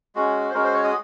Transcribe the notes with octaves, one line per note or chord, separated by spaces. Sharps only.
G#3 C#4 F#4
C5
G#3 C#4 F#4 A#4
C5
C#5
D#5